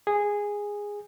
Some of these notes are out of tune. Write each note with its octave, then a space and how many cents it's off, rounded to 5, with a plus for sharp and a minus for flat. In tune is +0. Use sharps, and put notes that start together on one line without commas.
G#4 -10